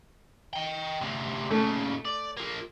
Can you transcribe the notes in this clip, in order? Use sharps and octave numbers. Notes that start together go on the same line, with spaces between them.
D#5 G5
D2 C3
A#2 C#3 A3
D5
F3 A#3